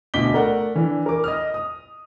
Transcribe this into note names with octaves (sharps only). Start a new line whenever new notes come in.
D2 B2 D#5 D6 B6 G7
A3 A#4 D5 F#5
E3 D4
A#4 D6
D#5 D#6 F6
D#6